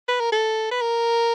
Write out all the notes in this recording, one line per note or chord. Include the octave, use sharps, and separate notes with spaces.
B4
A#4
A4
B4
A#4